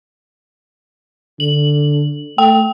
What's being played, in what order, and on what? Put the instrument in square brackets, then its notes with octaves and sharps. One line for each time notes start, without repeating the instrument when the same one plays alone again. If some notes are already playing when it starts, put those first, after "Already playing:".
[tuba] D3 [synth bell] F#7
[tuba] A3 [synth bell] G5